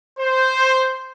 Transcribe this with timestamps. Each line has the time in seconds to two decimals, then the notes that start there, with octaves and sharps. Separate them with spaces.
0.18 C5